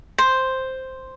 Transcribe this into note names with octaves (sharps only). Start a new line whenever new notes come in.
C5